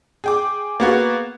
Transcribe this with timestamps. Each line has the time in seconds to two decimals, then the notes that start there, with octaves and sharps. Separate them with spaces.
0.24 G#4 G5 D6
0.80 A#3 B3 F#4 G#4